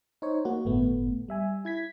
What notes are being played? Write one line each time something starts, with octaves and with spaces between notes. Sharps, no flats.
D#4 C5 C#5
A#3 F#4
G1 A2 A3 B3
G3 E5 G#5
E4 G#6 B6